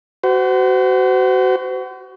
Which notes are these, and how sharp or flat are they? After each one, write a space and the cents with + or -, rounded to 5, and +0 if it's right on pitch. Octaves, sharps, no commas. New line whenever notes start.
F#4 +20 C5 -40